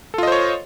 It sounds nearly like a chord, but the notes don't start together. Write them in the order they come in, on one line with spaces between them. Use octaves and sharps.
A4 F4 D#5 C5 C#5